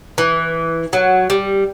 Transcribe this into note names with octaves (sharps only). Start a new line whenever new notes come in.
E3
F#3
G3